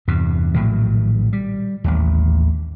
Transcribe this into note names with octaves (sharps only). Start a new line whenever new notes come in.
E2 G2 C3
A#1 A2 D#3 F#3
G3
A1 D#2